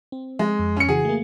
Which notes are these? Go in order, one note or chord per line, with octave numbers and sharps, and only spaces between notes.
C4
G#3
F2
C#4 C#7
C#3 E3 F#4 G#4
A3 A#3